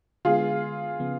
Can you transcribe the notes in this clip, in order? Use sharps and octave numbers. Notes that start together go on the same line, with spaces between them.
D3 G#3 B3 F4 G#4
C#3 F3 B3